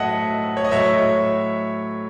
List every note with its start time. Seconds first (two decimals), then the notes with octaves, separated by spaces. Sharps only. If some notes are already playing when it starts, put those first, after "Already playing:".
Already playing: A2 F#3 A4 D#5 E5 F#5
0.57 C#5
0.64 D#5
0.71 A2 F#3 C#5 E5